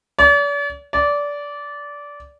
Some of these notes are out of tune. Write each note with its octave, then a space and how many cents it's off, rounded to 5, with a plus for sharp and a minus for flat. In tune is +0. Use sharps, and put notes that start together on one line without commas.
D5 -45
D5 -20